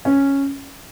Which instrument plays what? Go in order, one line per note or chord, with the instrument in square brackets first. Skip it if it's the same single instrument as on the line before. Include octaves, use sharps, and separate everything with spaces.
[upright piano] C#4